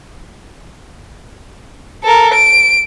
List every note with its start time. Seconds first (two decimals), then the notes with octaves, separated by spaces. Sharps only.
2.04 A4 A#4
2.34 D7